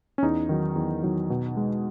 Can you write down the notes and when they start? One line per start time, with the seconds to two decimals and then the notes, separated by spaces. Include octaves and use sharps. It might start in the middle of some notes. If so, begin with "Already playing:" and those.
0.18 C#4
0.22 E2 D#4
0.49 D#3 F#3
0.76 E2
1.03 D#3 F#3
1.30 B2
1.57 G#3